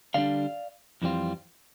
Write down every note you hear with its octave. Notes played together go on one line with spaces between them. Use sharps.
D3 G3 D4 D5 F5
F2 E3 G3 C4 F4